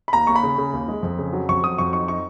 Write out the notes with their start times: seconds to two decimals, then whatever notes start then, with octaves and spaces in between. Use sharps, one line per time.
0.08 B5
0.13 D#2 A#5
0.27 D#2 C#6
0.36 B5
0.43 C#3
0.58 C#3
0.73 D#2
0.88 G#3
1.03 F2
1.18 C#3
1.33 F#3
1.49 F2 C#6
1.64 F#3 D#6
1.78 F2 C#6
1.93 D#4 C#6
2.08 D#4 C#6